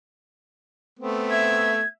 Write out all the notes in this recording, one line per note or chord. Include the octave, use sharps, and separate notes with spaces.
A3 B3 C4
E5 G#6